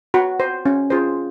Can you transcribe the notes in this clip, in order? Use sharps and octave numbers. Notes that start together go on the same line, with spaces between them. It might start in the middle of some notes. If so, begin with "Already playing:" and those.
F#4
C5
C#4
F4 G#4 C5